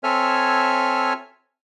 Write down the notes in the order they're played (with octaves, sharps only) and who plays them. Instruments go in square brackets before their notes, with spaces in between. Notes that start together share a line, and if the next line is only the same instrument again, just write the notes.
[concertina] C4 A4 C#5 E5 G#5 F6